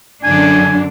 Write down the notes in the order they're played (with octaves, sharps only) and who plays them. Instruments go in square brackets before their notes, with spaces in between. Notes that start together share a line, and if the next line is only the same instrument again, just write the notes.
[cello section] F#2 D3 D4 [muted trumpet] G#5